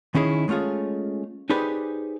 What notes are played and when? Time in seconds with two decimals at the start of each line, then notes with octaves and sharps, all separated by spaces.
0.15 D#3 C#4 D#4 E4 G#4
0.48 G#3 A3 C#4 F4 G#4
1.50 D#4 G4 G#4 B4 C5 D5